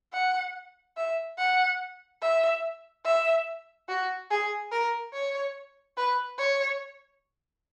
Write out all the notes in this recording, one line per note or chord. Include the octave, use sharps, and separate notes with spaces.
F#5
E5
F#5
E5
E5
F#4
G#4
A#4
C#5
B4
C#5